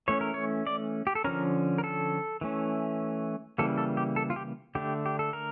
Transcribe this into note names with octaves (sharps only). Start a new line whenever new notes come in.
E3 A3 C#4 C#5
A#4
C#5
D5
G4
A4
D3 F3 C#4 A#4
A#4
A4
E3 A3 C#4
C#3 E3 G3 A#3 A4
A4
G4
A4
F4
G4
D3 A3 D4 G4
G4
A4
A#4